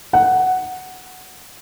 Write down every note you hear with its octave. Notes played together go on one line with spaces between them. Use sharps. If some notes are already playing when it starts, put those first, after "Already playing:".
F#5